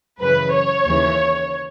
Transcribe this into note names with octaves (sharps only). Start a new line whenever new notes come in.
F#2 C#3 E3 B4
C#5
D#2 C#3 E3